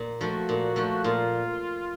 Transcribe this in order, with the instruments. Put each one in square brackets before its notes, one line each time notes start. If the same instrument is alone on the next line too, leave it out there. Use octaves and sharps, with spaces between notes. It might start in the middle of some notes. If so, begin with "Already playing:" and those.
Already playing: [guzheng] A#2
[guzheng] F3 A3 [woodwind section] F#4
[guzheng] A#2
F3 A3
[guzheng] A#2 [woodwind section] F4